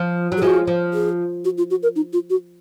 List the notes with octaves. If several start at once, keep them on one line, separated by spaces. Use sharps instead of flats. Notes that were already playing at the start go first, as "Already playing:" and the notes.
Already playing: F3
F#3
G#4
F3 G#3 F#4
F3
G#4
F#4
F4
F#4
A#4
D#4
F4
F#4